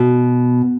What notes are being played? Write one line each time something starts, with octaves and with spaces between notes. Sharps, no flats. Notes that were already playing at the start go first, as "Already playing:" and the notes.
Already playing: B2